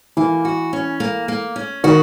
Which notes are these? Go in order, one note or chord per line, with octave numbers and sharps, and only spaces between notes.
E3 A#3
F#4
C#4
A#3
A#3
C#4
D#3 F#4